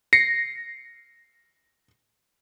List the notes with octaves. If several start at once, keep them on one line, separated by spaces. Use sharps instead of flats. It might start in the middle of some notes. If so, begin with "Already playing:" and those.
A#6 C7 C#7